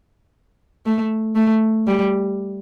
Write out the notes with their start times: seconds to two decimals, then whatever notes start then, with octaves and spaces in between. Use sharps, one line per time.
0.86 A3
1.35 A3
1.87 G3